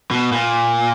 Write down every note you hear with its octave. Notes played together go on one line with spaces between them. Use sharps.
B2
A#2